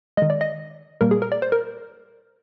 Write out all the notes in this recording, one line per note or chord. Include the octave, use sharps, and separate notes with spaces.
D#3 G#3 D#5
D5
D#5
A#2 G3 A#3 A#4
G#4
A#4
D5
C5
A#4